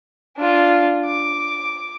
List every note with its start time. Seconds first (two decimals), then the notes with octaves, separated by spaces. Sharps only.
0.37 D4 F4
1.06 D6